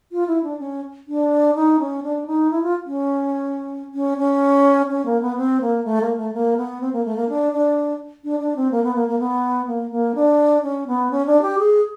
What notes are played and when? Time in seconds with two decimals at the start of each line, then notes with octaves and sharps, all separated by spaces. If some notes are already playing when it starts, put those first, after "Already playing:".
0.12 F4
0.27 E4
0.44 D4
0.59 C#4
1.08 D4
1.55 D#4
1.80 C#4
2.03 D4
2.27 D#4
2.51 E4
2.63 F4
2.86 C#4
3.94 C#4
4.18 C#4
4.90 C#4
5.06 A#3
5.22 B3
5.37 C4
5.61 A#3
5.85 A3
6.01 A#3
6.16 A3
6.34 A#3
6.57 B3
6.81 C4
6.93 A#3
7.05 A3
7.16 A#3
7.29 D4
7.53 D4
8.24 D4
8.40 D4
8.56 C4
8.71 A#3
8.83 B3
8.96 A#3
9.08 A#3
9.19 B3
9.67 A#3
9.91 A#3
10.15 D4
10.63 C#4
10.87 B3
11.11 C#4
11.26 D4
11.42 G4
11.58 G#4